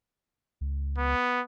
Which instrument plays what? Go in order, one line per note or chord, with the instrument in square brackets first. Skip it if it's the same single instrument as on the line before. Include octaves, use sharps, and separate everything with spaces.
[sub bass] C#2
[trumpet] B3